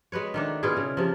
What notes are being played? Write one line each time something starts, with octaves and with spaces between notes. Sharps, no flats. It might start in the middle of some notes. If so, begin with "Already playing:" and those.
G#3 F#4 B4 C#5
D#3 A3 D4
B2 E4 F4 G#4
C#3
C3 F3